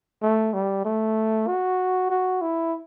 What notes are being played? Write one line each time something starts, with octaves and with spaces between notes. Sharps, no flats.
A3
G3
A3
F#4
F#4
E4